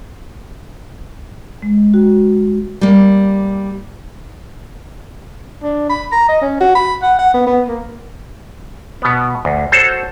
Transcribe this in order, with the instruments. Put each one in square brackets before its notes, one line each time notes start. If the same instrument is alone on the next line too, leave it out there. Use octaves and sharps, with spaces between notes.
[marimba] G#3
F#4
[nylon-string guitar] G3 A#3
[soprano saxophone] D4
B5
A#5
D#5
C#4
F#4
B5
F#5
F#5
B3
B3
A#3
[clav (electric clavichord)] B2 B3
D2
F#4 A4 C5 C#5